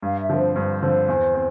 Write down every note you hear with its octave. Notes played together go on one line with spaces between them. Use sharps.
G2 F5
E5
D3 F3 C4 A#4
C5
G2 C5
D3 F3 C4
E2
C4